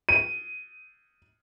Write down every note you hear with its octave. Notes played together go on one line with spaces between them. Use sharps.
D#7